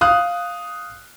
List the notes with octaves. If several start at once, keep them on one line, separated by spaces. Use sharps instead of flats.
F5 D#6 F#6